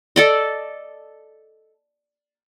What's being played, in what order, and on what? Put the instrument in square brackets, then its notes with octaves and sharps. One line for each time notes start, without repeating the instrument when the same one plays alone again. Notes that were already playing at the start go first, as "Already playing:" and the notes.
[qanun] A4 D5 D#5